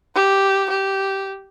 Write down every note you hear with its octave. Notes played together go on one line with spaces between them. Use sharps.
G4
G4